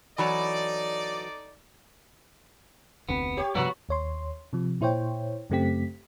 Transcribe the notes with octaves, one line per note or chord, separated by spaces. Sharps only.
E3 F#3 D#4 A4 D5 A#5
F1 D2 B3 C4
G4 C#5
G2 C3 F3 B3 F#4
D#2 C#5 C6
C3 F3
A#2 E4 C5 C#5 G5
F#2 C#3 A3 C4 G4 B6